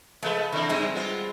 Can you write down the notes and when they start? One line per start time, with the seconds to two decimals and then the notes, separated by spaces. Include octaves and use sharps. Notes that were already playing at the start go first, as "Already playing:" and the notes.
0.23 F3 G#3 A3 B4
0.52 D3 E3 A3 C4
0.69 G2 G3 G#3 C4
0.95 B3 F4